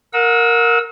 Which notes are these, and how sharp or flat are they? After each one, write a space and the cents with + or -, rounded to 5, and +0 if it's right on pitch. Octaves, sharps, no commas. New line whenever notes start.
A#4 +0 F#5 -40 E6 -30